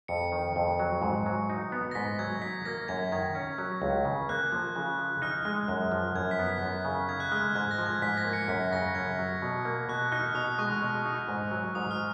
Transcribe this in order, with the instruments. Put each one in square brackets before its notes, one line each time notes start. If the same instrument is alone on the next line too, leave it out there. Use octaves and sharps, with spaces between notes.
[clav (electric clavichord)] F2 [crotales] C#7
[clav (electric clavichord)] D#3
F2
F#3
G#2
F#3
D#4
B3
[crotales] A#6
[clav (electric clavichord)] G#2 [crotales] B6
[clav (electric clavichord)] F#3 [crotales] G#6
[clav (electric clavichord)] D#4 [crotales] B6
[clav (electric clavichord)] A#3 [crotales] A#6
[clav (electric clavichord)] F#2 [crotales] G#6
[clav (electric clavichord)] D#3 [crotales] G#6
[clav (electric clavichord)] C#4
F#3
C#2
C#3
[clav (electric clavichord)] A#3 [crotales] F#6
[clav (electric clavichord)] F3
C#3
F3
[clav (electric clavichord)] D#4 [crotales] F6
[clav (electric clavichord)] G#3
F#2
F3
[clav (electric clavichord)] F#2 [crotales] G#6
[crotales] B6
[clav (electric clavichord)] B3
[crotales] B6
[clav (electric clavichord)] F#2
C#3
[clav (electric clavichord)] D#4 [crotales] G#6
[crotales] F#6
[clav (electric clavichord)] G#3 [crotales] F6
[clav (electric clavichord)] G#2 [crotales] G#6
[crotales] A#6
[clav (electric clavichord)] F3
[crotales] G#6
[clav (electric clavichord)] G#2 [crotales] B6
[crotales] A#6
[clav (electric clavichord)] A#3
[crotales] C#7
[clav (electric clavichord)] F#2 [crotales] B6
[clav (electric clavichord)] C#3 [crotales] A#6
[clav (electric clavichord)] F#2 [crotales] G#6
[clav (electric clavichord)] F#3
B2
A#3
[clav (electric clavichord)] B2 [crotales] F#6
[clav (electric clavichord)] D#4 [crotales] F6
[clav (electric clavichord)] B2 [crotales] D#6
[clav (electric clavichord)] G#3 [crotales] C#6
[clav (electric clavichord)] B2
D#4
G#2
F#3
[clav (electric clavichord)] G#2 [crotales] D#6
[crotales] F6